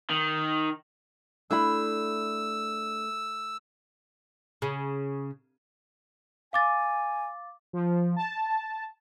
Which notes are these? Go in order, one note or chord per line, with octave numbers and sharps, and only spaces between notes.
D#3
A3 D4 E4 B5 E6
C#3
F5 G#5 D6 A6
F3
A5